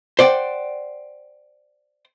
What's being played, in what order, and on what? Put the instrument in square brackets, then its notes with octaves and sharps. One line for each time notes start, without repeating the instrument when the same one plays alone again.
[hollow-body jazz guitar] C5 D5 F#5 G5